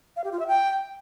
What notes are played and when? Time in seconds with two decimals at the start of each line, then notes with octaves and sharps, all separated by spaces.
0.16 F5
0.24 G4
0.32 F4
0.40 E5
0.47 G5